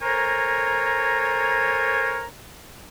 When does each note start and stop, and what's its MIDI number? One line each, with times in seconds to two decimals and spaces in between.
0.02 2.26 69
0.02 2.26 70
0.02 2.26 72
0.02 2.26 73
0.02 2.26 80
0.02 2.26 82